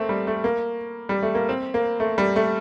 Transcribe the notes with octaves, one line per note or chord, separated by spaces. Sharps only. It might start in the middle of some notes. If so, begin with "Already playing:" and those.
Already playing: A3 A#3 C4
G3
A3
A#3
G3
A3
A#3
C4
A#3
A3
G3
A3